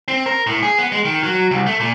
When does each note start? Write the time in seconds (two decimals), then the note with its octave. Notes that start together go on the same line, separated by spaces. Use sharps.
0.08 C4
0.26 A#4
0.47 A2
0.63 G#4
0.78 B3
0.92 G#3
1.05 D#3
1.23 F#3
1.51 C2
1.66 A3
1.80 A#2